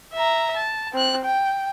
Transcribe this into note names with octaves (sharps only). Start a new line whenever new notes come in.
E5 A#5
A5
C4 F#6
G5